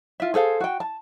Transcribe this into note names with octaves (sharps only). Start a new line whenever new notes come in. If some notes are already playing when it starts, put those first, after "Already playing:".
F4 E5
G#4 A4 C5 F5
F#4 G5
A5